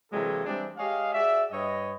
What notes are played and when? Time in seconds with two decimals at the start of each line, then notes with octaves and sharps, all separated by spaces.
0.12 C3 E3 F#3 G#3 A#3 A4
0.45 E3 G3 G#3 C4 D4
0.77 G#3 G4 C#5 D#5 F5
1.13 F#4 G#4 D5 E5
1.51 G2 B4 C#5 D#5